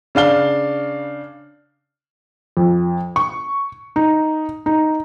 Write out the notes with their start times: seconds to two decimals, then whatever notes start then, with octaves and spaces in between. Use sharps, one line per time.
0.15 C#3 D4 F5 G7
2.57 F2
3.16 C#6
3.96 D#4
4.66 D#4